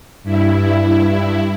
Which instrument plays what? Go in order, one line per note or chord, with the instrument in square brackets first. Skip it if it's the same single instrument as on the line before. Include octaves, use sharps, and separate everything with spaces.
[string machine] G2 E4